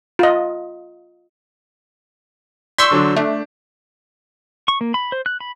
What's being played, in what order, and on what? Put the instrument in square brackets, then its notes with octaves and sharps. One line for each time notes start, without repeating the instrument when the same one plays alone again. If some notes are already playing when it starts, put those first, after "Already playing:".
[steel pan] F4 D#5
[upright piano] D5 G6 B6 [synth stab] C6 C#6 E6
[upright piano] D3 F#3 D4
[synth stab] A3 [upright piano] D4
[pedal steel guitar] C#6
A#3
B5
C5
F#6
B5